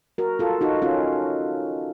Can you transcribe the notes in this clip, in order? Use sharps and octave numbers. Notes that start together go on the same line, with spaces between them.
F#4 A#4
F4 A4
D#4 F#4
C#4 F4